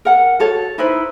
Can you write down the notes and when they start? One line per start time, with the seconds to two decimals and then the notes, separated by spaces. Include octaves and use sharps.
0.05 A#4 F#5
0.40 F#4 A4 C#5
0.78 D#4 E4 B4 C5